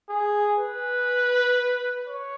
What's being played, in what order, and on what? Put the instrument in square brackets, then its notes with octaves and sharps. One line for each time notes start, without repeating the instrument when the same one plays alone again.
[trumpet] G#4
B4
C#5